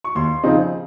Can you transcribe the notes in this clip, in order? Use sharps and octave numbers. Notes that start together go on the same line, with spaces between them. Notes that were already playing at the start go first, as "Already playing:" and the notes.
C#6
D#2 C6
C#3 F3 C4 D#4